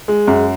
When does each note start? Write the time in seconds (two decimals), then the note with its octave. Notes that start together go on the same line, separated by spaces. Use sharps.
0.08 G#3
0.28 F#2